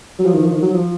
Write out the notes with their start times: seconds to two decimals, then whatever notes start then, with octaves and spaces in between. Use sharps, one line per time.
0.19 F#3
0.26 F3
0.34 D#3
0.42 F3
0.51 D#3
0.62 F#3
0.73 F3